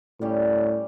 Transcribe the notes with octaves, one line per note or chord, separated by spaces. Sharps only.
A2 G3 C#4 G4